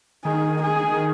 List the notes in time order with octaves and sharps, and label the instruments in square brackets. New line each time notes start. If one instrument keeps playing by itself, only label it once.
[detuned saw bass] D#3 [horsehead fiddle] G#4
[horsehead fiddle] G#4